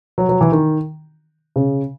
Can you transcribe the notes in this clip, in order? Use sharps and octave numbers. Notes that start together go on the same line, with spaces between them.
F#3
F#3
E3
D#3
C#3